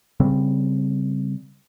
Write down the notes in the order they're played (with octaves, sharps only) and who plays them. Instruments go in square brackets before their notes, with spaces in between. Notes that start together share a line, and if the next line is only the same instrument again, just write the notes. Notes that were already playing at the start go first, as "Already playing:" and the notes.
[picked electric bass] C#3 G3 C4